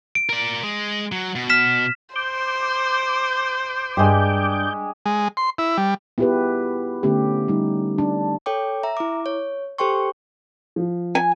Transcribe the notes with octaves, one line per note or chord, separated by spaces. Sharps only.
D7
A#4 D5
G#3
F#3
B2
F6 B6 E7
C5 D6 G6
G2 G#3 G4
G#3
C6
E4
G3
B3 E4 F4 G4 G#4 B4
D3 A3 B3 C#4 G4
G3 D#4
D4
A4 C#5 G5 D6
E5 A#5
E4 D6
C#5
G4 A4 C5 G5 C6 C#6
F3
G#5